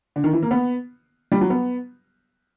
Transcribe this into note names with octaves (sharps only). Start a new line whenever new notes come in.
D3
D#3
E3
A#3
B3
G3
F#3
B3